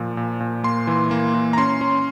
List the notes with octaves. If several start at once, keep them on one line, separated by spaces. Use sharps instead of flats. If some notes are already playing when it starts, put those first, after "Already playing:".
Already playing: A#2 F3
A#2
A#2
A#3 C6
E3
A#3
E3
A#5
C#4 C6
C#4